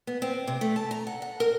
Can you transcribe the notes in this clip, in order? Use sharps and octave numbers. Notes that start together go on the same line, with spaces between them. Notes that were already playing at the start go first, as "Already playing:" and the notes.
B3
C4
C3
A3
A5
A#5
F#5
F#5
A#4